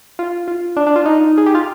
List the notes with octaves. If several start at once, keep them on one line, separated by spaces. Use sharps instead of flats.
F4
F4
D4
D4
F4
D#4
G#4
G4
F4